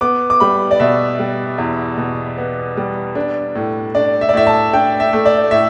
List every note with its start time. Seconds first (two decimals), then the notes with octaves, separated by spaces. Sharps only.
0.01 B3 D6
0.30 D6
0.40 G3 B5
0.71 D5
0.80 B2 E5
1.19 G3
1.58 E2
1.98 B2
2.38 B3
2.77 G3
3.15 D4
3.55 A2
3.95 D4 D5
4.21 E5
4.29 D5
4.34 A2 E5
4.47 A5
4.73 D4 G5
5.00 E5
5.13 A3
5.26 D5
5.51 A2 E5